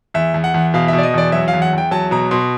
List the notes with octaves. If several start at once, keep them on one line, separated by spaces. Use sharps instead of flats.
E2 E5
E2
F#5
E2
B2 F5
B2 E5
D5
D#5
E2 D5
F#3 E5
F5
E2
F#5
E2 G5
F#3 A5
B2 A#5
B2 C6